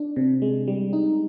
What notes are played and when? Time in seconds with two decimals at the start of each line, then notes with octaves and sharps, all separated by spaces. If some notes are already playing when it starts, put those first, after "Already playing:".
Already playing: D4
0.16 C3
0.42 G#3
0.68 G3
0.93 D#4